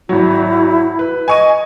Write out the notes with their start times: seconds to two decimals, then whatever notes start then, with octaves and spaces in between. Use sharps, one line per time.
0.09 G#1 F#3 E4
0.99 B4
1.28 D#5 G#5 C#6 D#7